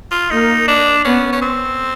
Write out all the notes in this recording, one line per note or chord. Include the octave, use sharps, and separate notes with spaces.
F4
A#3 D#4
D4
B3 C#4
C#4
C4